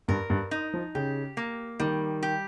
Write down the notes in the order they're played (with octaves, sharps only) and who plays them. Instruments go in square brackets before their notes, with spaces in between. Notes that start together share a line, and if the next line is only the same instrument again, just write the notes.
[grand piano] G2 [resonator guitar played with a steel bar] A#4
[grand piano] G2
[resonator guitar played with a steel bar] D#4
[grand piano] F3
[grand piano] C#3 [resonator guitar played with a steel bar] G4
[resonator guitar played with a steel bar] A#3
[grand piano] D#3 [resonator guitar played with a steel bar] G3
[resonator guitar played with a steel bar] G4